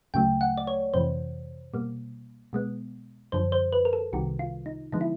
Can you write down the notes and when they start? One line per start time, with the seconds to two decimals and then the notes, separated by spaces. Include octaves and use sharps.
0.14 D2 C#3 F#3 A3 G5
0.41 F#5
0.57 D5
0.67 C#5
0.94 F2 C3 E3 C5
1.74 B2 G3 A#3
2.53 B2 G#3 B3
3.32 F#2 D3 F3 C5
3.52 C5
3.73 B4
3.85 A#4
3.93 A4
4.13 C2 C3 D#3 G3 F#4
4.39 F4
4.66 D#4
4.92 D3 F3 G#3 B3 D#4
5.01 E4